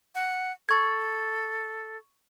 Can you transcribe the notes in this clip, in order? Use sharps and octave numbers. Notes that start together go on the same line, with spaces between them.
F#5
A4 C#6 G#6